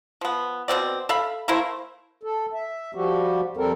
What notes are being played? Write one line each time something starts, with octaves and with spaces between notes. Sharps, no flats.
F3 B3
B2 B3 C4 D5
A4 E5 F5 B5
A3 A#3 E4 C5
A4
E5
F3 G3 F#4 G4
F2 G3 C4 A4 A#4